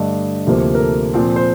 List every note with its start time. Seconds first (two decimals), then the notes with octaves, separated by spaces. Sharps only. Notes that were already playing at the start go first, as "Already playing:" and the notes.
Already playing: G2 D3 A3 D5 D#5
0.47 D2 C3 F3 A#3
0.75 A#4
0.80 A4
1.14 A#2 F3 C4
1.36 C5